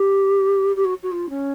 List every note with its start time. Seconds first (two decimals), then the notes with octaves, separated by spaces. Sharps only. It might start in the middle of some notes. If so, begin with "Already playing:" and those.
Already playing: G4
0.76 G4
0.85 F#4
1.03 F#4
1.12 F4
1.29 C#4